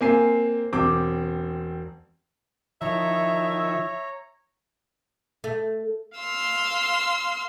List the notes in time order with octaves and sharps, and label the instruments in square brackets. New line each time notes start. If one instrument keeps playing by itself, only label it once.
[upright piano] A#3 C4 G#5 C7
E1 C4 D6 G6
[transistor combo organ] D#3 E4 [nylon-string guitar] F3 [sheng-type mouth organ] C#5 A#5 [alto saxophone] E5
[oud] A3
[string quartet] F5 C6 E6